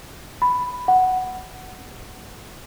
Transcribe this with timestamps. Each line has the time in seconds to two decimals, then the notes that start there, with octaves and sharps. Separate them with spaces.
0.42 B5
0.88 F#5